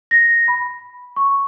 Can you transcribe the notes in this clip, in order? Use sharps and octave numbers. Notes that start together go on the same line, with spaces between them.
A#6
B5
C#6